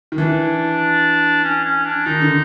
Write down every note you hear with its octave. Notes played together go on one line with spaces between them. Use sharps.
D#3
E3 D4
C#4
C#4
D4
D#3 D#4
D3